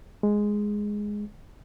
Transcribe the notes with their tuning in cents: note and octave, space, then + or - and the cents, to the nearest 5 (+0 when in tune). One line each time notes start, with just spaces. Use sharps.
G#3 +0